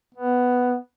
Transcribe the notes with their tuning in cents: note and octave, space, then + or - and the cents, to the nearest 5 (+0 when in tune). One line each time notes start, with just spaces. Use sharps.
B3 +5